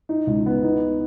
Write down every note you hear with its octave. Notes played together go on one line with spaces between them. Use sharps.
D#4
C#2
B3
D#4